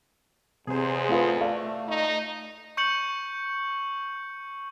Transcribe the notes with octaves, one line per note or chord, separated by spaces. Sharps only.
E2 C3 G#4 C5
A3 F4 B4
A3 D5 F5
D#4
C#6 G6 C#7 F#7